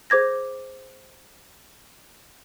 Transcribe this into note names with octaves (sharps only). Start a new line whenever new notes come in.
G#4 C5 D6 G#6 A#6